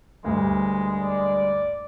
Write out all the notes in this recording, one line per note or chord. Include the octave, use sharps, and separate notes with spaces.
D2 G2 G#3
D5